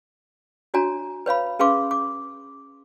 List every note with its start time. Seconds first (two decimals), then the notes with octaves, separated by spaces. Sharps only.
0.74 D4 F#4 C#5 G#5 A#5
1.26 B4 C#5 F5 B5
1.59 C#4 G#4 B4 F5 C6 D6
1.91 D6